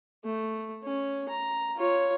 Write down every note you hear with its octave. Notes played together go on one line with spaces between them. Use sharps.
A3
C#4
A#5
F4 C#5